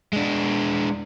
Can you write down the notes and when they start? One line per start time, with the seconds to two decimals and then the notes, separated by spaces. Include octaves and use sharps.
0.13 G#3 D4